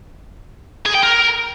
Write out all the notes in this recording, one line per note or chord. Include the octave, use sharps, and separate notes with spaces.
G#4
G5
A#4